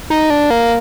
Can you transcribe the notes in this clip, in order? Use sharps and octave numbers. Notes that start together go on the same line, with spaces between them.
D#4
D4
A#3